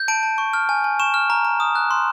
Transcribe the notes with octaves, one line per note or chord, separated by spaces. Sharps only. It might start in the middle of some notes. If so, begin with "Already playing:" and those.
Already playing: G6
A5 D7
A5
C#6
F6
G#5
G#5
C#6 E7
F6
A#5
A#5
D#6
F#6
C6